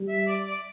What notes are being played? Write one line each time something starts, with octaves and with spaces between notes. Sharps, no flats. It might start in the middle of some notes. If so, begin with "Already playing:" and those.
Already playing: G3
E5
D5
D5